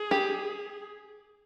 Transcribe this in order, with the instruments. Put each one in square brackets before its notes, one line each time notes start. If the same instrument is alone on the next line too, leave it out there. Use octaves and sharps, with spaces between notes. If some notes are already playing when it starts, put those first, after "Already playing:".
Already playing: [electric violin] G#4
[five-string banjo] G4